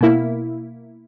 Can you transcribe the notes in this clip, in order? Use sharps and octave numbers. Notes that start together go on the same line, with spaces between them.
B2 A#3 E4